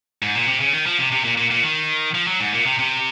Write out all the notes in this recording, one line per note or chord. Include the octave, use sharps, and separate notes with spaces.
G#2
A#2
C3
C#3
D#3
F3
C3
C3
A#2
A#2
A#2
D#3
F3
F#3
G#2
A#2
C3
C3